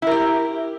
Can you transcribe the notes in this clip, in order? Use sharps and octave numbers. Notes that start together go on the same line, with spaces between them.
E4 G4 A#4